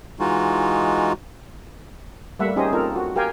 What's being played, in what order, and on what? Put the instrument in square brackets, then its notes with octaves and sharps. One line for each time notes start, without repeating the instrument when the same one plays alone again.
[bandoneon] E3 G#3 D#4 F4 F#4
[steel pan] G3 A3 A#3 E5 F#5
C#4 D#4 G4 G#4 C5 D#5
A#3 C4 D#4 F4 A4 A#4
F#4
G4 A#4 F5 G5 G#5